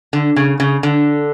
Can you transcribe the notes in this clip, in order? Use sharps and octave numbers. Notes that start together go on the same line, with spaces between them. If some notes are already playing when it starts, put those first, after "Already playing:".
D3
C#3
C#3
D3